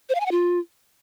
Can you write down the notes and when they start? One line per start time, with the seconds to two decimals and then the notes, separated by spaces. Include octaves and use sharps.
0.09 C5
0.15 F5
0.20 G#5
0.26 F#5
0.31 F4